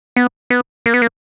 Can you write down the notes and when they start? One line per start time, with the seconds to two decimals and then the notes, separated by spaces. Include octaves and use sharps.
0.16 B3
0.50 B3
0.86 A#3
0.94 B3
1.02 A#3